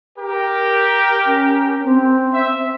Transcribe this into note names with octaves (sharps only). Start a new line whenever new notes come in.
G4 A#4
C#4
C4
E5